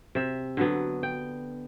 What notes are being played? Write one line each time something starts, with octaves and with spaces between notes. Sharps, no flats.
C3 E5
D3 F#3 B3
G5